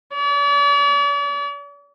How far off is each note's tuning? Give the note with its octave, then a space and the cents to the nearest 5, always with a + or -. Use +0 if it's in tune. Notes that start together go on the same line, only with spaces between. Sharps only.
D5 -45